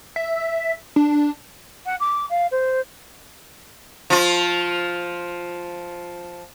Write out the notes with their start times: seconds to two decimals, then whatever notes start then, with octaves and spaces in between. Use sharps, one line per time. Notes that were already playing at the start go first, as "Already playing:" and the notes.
0.16 E5
0.96 D4
1.85 F#5
2.00 D6
2.29 F5
2.51 C5
4.10 F3 F4